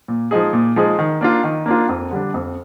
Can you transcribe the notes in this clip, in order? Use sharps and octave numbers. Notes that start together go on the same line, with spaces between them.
A#2
F3 G#3 D#4 G#4
A#2
F3 G#3 D#4 G#4
D#3
A#3 D4 F4
D#3
A#3 D4 F4
F2
D3 G3 D4
F2